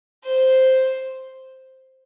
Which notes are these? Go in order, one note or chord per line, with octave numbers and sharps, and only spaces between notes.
C5